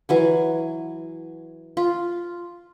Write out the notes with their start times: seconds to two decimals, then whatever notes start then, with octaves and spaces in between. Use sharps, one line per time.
0.09 E3 F#3 G#5
1.77 F4